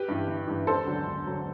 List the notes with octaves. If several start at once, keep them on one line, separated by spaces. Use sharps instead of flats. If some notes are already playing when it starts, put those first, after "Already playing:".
Already playing: G4 B4
G2 E3
G1
G2 E3
E1 A4 C5
D2 D3 F#3
E1
D3 F#3